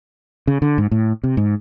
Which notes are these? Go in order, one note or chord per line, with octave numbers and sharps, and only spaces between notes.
C#3
D3
G#2
A2
C3
G#2